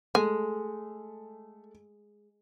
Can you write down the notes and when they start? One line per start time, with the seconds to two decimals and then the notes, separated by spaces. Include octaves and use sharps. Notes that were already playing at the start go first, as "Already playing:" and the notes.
0.15 G#3 A3 G#5